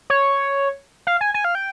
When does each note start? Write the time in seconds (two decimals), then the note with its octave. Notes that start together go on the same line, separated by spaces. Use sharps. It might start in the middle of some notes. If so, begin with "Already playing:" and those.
0.10 C#5
1.07 F5
1.21 G#5
1.34 G#5
1.45 F5
1.55 G5